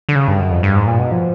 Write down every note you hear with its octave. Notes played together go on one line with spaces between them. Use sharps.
D3
C#3
G2
F#2
F2
G2
G#2
A#2
B2
F3